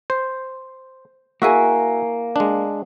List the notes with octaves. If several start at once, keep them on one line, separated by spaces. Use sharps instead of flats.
C5
A#3 E4 F#4 G#4 E5 G#5
G#3 D4